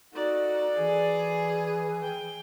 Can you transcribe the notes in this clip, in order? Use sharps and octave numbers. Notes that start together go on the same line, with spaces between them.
D#4 F#4 A4 D5
E3 G#4
G5